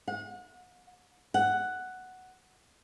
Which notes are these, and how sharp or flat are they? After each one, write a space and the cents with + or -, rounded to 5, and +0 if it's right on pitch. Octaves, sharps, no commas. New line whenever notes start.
F#5 -35
F#5 +5